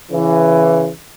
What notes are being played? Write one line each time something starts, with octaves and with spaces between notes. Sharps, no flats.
C#3 E3